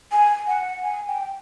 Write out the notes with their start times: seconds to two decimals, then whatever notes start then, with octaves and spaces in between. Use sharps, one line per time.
0.12 G#5
0.47 F#5
0.84 G#5
1.08 G5